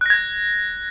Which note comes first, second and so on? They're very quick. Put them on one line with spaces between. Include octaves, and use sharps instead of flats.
F#6 A#6 G#6